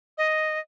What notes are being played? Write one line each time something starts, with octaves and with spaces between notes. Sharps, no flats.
D#5